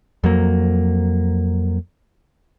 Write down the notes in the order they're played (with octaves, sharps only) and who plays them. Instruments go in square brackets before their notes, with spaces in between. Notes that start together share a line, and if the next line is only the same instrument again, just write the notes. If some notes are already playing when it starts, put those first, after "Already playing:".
[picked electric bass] F2 F#3 A#3